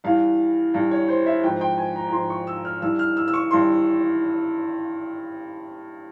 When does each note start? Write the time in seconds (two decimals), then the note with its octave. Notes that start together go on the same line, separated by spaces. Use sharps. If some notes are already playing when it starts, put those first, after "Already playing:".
0.04 G2 E3 F5
0.74 G2 E3
0.91 C#5
1.08 C5
1.26 E5
1.43 G#2 F3 G5
1.61 G5
1.78 G#5
1.96 A#5
2.08 A#5
2.12 G#2 F3 C6
2.30 C#6
2.47 E6
2.65 F6
2.82 G2 E3 E6
2.99 F6
3.17 E6
3.28 E6
3.34 C#6
3.51 G2 E3 C6